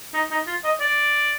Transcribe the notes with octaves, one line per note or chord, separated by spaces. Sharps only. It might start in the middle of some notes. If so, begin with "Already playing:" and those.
D#4
D#4
F4
D#5
D5